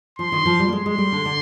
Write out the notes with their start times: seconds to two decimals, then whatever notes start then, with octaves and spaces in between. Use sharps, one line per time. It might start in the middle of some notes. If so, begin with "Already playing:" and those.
0.19 F3 C6
0.32 D#3
0.46 F3
0.59 G3
0.68 A#3
0.73 G#3 C6
0.86 G#3
0.98 G3
1.12 D3
1.25 D3